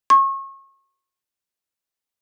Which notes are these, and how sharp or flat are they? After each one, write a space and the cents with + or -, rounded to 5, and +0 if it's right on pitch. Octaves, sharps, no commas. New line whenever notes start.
C#6 -35